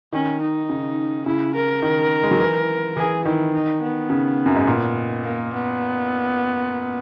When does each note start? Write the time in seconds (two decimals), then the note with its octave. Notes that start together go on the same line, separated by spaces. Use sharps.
0.13 D#3 C#4
0.41 D#4
0.69 C#3
1.26 C#3 E4
1.55 A#4
1.82 D#3
2.23 G#3
2.31 F#3
2.40 E3
2.97 E3 G#4
3.25 D#3 E4
3.54 D#4
3.81 B3
4.10 C#3
4.46 F#2
4.56 G#2
4.67 A#2
5.23 A#3
5.53 B3